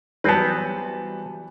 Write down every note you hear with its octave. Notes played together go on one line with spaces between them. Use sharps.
E3 F#3 G3 B3 C4 B4 A5